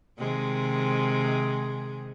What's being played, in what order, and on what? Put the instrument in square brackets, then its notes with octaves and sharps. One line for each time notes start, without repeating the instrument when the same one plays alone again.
[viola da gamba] C3 D#3 G#3